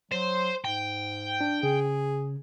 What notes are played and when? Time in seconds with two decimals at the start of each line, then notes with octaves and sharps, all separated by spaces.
0.12 F#3 C5
0.65 G#2 G5
1.41 D4
1.63 C#3 G#4